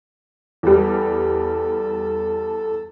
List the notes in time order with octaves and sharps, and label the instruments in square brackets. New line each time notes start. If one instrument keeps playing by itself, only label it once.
[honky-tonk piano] E2 G3 [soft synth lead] A4